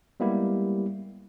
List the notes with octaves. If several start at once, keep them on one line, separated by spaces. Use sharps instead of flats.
G3 G#3 A#3 B3 E4 G4